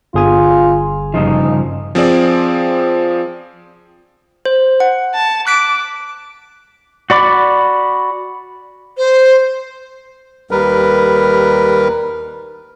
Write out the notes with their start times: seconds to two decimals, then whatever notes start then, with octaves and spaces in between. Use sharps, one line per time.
0.14 G1 F4 G#4 G#5
1.14 G2 C#3 F3 D#4
1.95 F3 C4 G#4 D5
4.45 C5
4.80 F#5
5.14 A5
5.47 D6 F#6 B6 D7
7.10 F#4 D5 B5 D6
8.98 C5
10.51 D#2 G3 A#4 B4